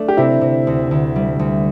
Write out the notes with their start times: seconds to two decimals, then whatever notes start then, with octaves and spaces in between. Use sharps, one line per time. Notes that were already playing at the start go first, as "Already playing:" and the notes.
Already playing: A3 D4
0.08 G4
0.17 C3 C4 E4
0.41 C3
0.67 D2
0.91 D2
1.16 G3
1.39 D2